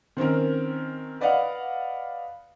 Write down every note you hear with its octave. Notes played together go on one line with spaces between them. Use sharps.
D#3 C4 C#4 A#4
B4 D5 D#5 F5 F#5